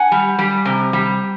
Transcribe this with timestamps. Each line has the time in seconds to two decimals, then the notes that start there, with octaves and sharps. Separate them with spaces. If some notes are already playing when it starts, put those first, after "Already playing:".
Already playing: F#5 G#5
0.12 G3
0.39 G3
0.65 C3
0.93 G3